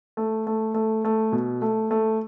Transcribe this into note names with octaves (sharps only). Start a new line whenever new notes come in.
A3
A3
A3
A3
B2
A3
A3